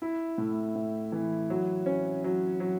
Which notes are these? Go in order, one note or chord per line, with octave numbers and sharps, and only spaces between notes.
E4
A2
A2
E3
F#3
C#4
F#3
F#3